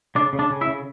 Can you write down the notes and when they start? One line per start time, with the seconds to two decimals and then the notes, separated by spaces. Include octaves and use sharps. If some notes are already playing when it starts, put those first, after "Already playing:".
0.15 C#3 D4 D5
0.33 C#3
0.39 D4 D5
0.50 C#3
0.61 E4 E5
0.67 C#3